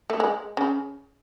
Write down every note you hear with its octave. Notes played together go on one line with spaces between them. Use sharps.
A3
G#3
C#3